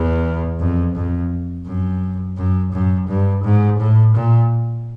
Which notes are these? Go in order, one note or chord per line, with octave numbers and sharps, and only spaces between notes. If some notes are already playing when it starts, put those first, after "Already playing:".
Already playing: E2
F2
F2
F#2
F#2
F#2
G2
G#2
A2
A#2